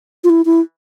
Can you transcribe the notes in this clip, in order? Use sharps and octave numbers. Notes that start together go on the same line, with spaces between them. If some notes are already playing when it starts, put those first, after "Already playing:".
F4
E4
E4